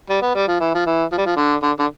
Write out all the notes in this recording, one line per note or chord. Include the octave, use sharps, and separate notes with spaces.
G3
B3
G3
F3
E3
F3
E3
F3
G3
F3
D3
D3
D3